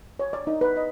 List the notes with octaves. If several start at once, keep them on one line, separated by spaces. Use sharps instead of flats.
C#5
D5
D#4
B4
D#5